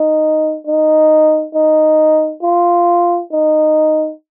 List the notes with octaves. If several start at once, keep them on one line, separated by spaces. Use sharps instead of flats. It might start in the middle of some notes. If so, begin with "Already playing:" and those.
Already playing: D#4
D#4
D#4
F4
D#4